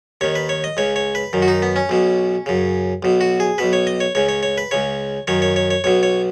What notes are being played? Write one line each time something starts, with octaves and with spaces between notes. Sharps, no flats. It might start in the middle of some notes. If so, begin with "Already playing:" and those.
D#2 D#3 C#5
B4
C#5
D#5
C#2 C#3 C#5
C#5
B4
F#2 D#3
F#4
D#4
B3
C#4
B1 B2
F#2 C#3
B1 B2
F#4
G#4
B1 B2 B4
C#5
D#5
C#5
C#2 C#3 C#5
C#5
C#5
B4
C#2 C#3 C#5
F#2 D#3 C#5
C#5
C#5
C#5
B1 B2 C#5
C#5